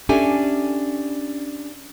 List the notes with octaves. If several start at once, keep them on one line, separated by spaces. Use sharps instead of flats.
C#4 D4 G4 A4 E5 G#5